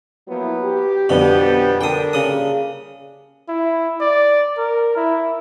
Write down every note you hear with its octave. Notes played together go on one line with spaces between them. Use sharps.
F3 F#3 A#3 B3 E4
G4
F2 B2 D3 G3 B3
D3 D4 A#4 G5 D#6
G2 A#2 C#3 G3 D#6
E4
D5
A#4
E4